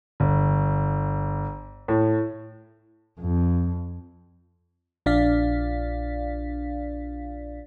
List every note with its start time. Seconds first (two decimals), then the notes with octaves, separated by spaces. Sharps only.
0.20 G1
1.88 A2
3.21 F2
5.06 A#1 D4 D5 F5 B6